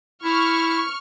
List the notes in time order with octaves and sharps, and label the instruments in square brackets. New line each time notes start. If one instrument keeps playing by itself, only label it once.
[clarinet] E4 [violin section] C#6 F6